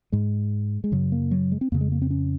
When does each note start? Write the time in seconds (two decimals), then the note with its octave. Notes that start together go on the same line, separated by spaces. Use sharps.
0.12 G#2 G#3
0.84 G#3
0.92 F#2 C#3 F#3
1.12 A#3
1.31 F#3
1.52 G#3
1.61 C4
1.72 F2 C#3 A#3
1.81 G#3
1.92 A#3
2.02 C4
2.10 C#4